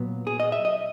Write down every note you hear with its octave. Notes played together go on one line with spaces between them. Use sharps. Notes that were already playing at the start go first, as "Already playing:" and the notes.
Already playing: A#2 F#3 B3
G#4
D#5
E5
D#5